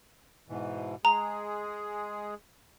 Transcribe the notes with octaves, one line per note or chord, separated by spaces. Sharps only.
G#2 B2 E3
G#3 G#4 A#5